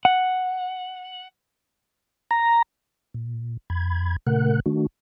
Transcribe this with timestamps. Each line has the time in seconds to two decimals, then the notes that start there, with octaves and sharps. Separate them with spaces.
0.05 F#5
2.31 A#5
3.14 A#2
3.70 F2 B5 G#6
4.27 A#2 C#3 A3 A#4 F#5 F#6
4.66 D#3 A3 D4 F#4